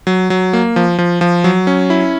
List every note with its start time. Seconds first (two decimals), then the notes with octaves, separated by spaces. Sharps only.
0.07 F#3
0.30 F#3
0.53 A#3
0.76 F3
0.98 F3
1.21 F3
1.44 F#3
1.67 C#4
1.90 E4